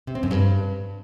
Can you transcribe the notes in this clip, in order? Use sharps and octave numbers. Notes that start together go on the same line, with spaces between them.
C3
C4
F#2
G2